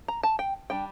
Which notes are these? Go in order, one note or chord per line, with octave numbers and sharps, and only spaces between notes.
A#5
A5
G5
G3 D4 G5